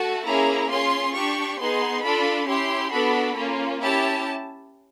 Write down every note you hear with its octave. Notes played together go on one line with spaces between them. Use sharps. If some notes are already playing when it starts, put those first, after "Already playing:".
Already playing: A3 F#4 A5
A#3 C#4 E4 G#4 A#5
C#4 F4 G#4 C6
D4 G4 C#6
B3 D#4 G#4 C6
D4 F4 A4 B5
C#4 E4 G4 C6
B3 D4 F#4 A4 B5
A#3 C#4 F4
C#4 E4 G4 A5